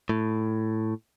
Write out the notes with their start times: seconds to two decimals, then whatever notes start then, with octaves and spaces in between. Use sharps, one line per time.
0.09 A2